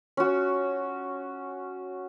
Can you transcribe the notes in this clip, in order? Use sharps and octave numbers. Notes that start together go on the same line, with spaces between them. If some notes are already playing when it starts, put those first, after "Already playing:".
C#4 F#4